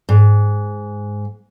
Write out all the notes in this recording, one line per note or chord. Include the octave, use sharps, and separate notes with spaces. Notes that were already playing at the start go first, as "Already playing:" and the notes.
G#2